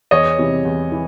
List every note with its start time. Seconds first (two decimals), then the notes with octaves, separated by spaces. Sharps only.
0.11 E2 C#5 D#5
0.38 C3 E3
0.65 E2
0.92 E3